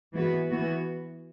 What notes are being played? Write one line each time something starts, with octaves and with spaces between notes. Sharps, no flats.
E3 G#3 B3 F#4 B4
E3 B3 F#4